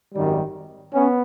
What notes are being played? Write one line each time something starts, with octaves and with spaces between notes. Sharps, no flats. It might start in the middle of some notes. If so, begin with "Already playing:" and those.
G#1 F#2 D#3 G3
B3 C#4